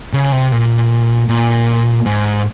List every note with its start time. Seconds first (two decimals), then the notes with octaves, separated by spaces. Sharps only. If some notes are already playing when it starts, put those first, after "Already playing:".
0.13 C#3
0.32 C3
0.52 A#2
1.29 A#2
2.06 G#2